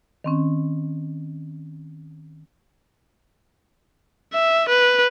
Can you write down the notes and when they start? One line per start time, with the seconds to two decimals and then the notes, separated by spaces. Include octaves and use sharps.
0.24 D#3 C4 C#4
4.33 E5
4.69 B4